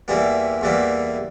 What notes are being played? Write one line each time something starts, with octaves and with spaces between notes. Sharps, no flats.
E2 E3 G3 A#3
E2 E3 G3 A#3